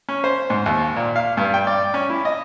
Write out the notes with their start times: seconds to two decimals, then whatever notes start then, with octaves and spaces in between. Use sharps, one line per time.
0.09 C#4
0.24 C5
0.50 G#2
0.66 D#2
0.96 A#2
1.16 F5
1.37 G2
1.54 G5
1.67 D5
1.94 C#4
2.10 E4
2.25 D#5